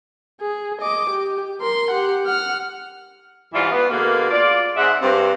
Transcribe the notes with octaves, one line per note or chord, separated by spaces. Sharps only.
G#4
D#5 D6
G4
A#4 C6
G4 F#5
F#5 F6
G#2 E3 G3 E4 F4
B3
B2 D3 G#3 A#3
F4 D5
G#2 G#3 C4 E5 F#5
G2 C4